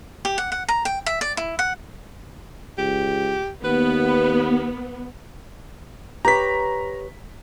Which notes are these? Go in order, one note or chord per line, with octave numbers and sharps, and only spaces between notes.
G4
F#5
F#5
A#5
G5
E5
D5
E4
F#5
C#2 G4
D#2 B3 B4
G4 B4 C#5 A#5 B6